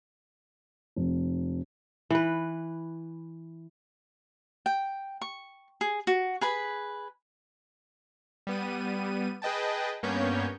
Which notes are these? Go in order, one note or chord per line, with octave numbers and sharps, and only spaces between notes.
F1
E3 B4
G5
C#6
G#4
F#4
G#4 B4 B5
G3 B3 D#7
G#4 B4 D#5 G5 A5
G2 A#3 B3 C#4 C#5 G6